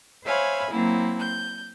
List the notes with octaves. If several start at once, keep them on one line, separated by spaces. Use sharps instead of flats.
C5 C#5 E5 F5 G#5 B5
F#3 A#3 C4 E4
G6